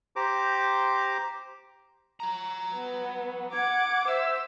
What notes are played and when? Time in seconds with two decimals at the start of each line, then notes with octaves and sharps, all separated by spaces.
0.16 G4 C5 A#5 D6
2.20 F#4 A#5
2.75 B3
3.53 F#5 D6 G#6
4.08 C5 E5 E6